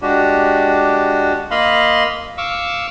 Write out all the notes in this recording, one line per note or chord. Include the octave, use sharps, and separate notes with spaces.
G#3 D4 F#4 G4
A#3 D#5 F5 B5 C6
F5 C#6 D6 E6